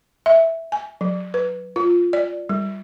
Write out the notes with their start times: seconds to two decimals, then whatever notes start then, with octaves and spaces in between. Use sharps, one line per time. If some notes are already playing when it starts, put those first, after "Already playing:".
0.26 E5
0.72 G#5
1.01 F#3
1.34 B4
1.76 F4
2.13 D5
2.49 G3